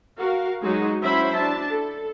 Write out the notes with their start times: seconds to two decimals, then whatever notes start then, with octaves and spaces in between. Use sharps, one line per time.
0.18 F#4 A#4 F5
0.63 F#3 G#3 D#4 F#4
1.02 F#3 C#4 E4 C5 E5 B5
1.36 D4 A5
1.70 A4